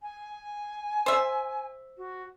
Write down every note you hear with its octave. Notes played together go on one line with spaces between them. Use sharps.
G#5
C5 E5
F#4